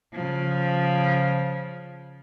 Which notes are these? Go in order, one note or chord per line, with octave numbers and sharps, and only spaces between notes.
C#3 F3